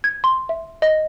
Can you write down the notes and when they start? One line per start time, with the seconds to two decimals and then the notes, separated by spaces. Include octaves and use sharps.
0.04 G#6
0.24 C6
0.49 E5
0.82 D#5